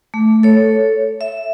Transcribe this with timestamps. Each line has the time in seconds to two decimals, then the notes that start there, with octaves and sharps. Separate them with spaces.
0.14 A3
0.43 A4 C#5
1.21 E5